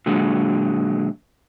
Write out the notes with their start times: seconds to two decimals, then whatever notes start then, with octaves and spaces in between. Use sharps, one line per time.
0.06 A#2 D3 F#3 G#3